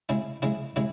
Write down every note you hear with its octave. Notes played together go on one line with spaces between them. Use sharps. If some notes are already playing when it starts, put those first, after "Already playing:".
C#3 G#3 E4
C#3 G#3 E4
C#3 G#3 E4